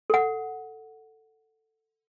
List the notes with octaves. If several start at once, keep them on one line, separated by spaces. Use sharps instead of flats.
A4 F#5